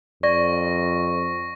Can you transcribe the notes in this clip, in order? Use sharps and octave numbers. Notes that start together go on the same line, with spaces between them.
F2 D5 C#6 A#6